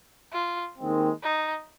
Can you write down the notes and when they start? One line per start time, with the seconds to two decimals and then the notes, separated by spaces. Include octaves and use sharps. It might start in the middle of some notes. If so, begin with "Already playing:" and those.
0.33 F4
0.78 D#2 D#3 G#3 C4
1.23 D#4